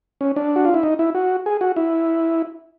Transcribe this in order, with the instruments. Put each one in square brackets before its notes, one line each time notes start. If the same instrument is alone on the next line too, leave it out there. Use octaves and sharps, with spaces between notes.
[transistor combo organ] C#4
D4
F#4
F4
E4
D#4
E4
F#4
G#4
F#4
E4